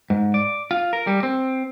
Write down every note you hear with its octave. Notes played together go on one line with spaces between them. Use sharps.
G#2
D5
F4
A#4
G3
C4